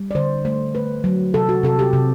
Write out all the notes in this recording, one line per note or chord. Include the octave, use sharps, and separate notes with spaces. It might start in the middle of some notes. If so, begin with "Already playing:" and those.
Already playing: G3
D5
D3 C5
A3 C5
A3 B4
F#3
C3 A4
F#4
C3 A4
G4
C3